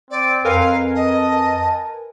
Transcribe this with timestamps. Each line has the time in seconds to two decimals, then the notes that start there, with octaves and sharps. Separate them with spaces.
0.11 C4 D5
0.45 F2 A#4 B4 F5 G#5
0.94 D#5 A5